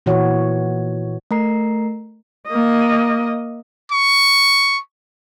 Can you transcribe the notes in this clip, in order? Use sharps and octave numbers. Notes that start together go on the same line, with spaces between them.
A#2 E3 F#4 C#5
A3 A#4 A#5 C7
A#3 D#5
C#6